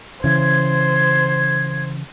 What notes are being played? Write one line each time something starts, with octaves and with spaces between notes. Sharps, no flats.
C#3 E3 C5 G#6